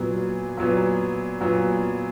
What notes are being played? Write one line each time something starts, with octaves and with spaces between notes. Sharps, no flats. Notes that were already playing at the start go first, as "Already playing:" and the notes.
Already playing: A#2 F#3 B3
A#2 F#3 B3
A#2 F#3 B3